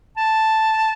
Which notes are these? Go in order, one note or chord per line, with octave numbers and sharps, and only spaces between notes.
A5